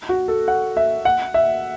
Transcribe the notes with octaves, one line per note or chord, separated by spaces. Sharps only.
F#4
A4
F#5
E5
F#5
E5